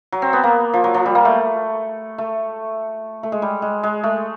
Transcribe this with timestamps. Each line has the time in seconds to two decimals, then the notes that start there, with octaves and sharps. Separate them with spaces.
0.12 F#3
0.22 C4
0.33 B3
0.43 A#3
0.74 F3
0.84 F#3
0.94 F3
1.06 G3
1.15 A#3
1.25 A3
2.18 A3
3.23 A3
3.32 G#3
3.42 G3
3.62 G#3
3.83 G#3
4.04 A3